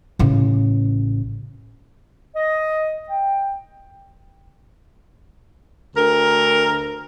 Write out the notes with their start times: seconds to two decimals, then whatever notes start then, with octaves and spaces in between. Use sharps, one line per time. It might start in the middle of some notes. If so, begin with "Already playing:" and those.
0.19 A1 C#3
2.36 D#5
3.09 G5
5.96 D2 A#4